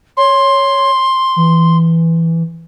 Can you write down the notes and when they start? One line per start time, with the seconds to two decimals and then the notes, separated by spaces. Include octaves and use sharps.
0.17 C#5 C6
1.36 E3